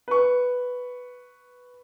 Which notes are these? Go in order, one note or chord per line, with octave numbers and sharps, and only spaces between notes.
B4 C#6